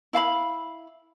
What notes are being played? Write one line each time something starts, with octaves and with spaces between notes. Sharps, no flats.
E4 F5 A5 B5